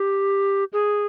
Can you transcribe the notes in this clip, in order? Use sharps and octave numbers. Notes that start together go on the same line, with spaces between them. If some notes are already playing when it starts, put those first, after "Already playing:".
Already playing: G4
G#4